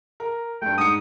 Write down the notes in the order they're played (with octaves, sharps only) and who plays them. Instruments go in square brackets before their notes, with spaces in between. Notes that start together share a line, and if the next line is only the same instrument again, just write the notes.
[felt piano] A#4
[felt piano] G2 A3 [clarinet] G5
[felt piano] G#2 C#7 [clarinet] D#6